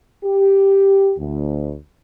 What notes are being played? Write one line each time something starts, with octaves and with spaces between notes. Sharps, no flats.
G4
D2